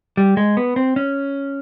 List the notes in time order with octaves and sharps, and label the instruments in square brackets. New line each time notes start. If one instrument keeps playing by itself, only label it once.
[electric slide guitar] G3
G#3
B3
C4
C#4